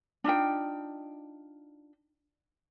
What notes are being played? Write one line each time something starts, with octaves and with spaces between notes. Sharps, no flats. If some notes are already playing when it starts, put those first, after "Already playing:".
D4 D#4 F4 G5